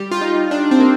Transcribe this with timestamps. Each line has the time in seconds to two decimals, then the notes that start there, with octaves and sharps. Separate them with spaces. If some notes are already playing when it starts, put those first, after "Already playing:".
Already playing: G3 G4
0.11 F4
0.21 D#4
0.36 G3
0.51 D4
0.71 C4
0.80 A#3